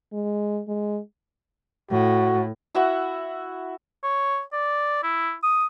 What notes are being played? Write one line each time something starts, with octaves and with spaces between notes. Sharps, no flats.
G#3
G#3
A2 F#4
E4 F#4 E5 F#5
C#5
D5
E4
D#6